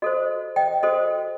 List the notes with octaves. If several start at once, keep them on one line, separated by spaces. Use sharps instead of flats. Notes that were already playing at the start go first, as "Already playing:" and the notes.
F#4 A4 C5 D#5
D#5 G5
F#4 A4 C5 D#5